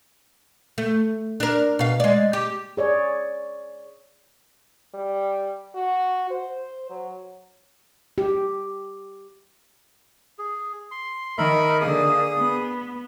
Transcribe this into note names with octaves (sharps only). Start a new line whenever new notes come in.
A3
D4 A#4
B2 F5
G#3 D5
G4
G#4 C#5 D5
G3
F#4
C5
F#3
G4
G#4
C6
D#3 A#4 E5 B5
D3 A#3 G#4 D#6
B3